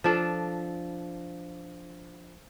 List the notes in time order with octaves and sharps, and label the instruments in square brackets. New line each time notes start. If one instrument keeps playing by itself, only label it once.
[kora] F3 D4 A4